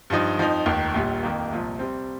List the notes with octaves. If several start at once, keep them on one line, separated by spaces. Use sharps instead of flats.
G2 F3 D#4
F2 F3 D#4
F1 D#2 D#3
A#1 A#2 G3
F2 D#3 A#3
C2 A#2 F3
C3 G3 C4